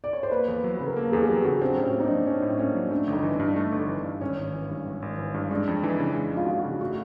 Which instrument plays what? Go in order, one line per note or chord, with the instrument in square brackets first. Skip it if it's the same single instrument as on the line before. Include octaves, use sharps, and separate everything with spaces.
[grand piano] D5
C#5
C5
[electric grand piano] A#3 [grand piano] B4
[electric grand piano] E2
F#3
[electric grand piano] C#3 [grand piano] B4
[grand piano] A#4
[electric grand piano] A#3 [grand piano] A4
[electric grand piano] E2 [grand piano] G#4
[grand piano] G#4
[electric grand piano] F#3 [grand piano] G4
[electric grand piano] C#3 [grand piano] F#4
[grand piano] C4 [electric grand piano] D4
[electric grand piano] A2
[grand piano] C#4
[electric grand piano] A#3
[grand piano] D#4
D4
[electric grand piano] F#3
[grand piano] C#4 [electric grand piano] D4
[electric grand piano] A2
[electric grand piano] A#3 [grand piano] C#4
[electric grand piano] F#3
[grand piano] C#4
[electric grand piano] A3 [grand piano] D4
[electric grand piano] G1
[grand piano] D#4
[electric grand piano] E3
[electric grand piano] G2 [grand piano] D4
[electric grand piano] A3
G1
E3
G2
[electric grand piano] G#1 [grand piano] C#4
[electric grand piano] G#1
E3
G2
G#1
G#1
E3
G2
[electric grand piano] G#3 [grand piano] D4
[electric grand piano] F2
[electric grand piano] E3 [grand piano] D#4
[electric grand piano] C#3
G#3
F2
[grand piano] F4
F#4
[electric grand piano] E3 [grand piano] F4
[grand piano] F#4
[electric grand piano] C#3
[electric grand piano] A3 [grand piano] F#4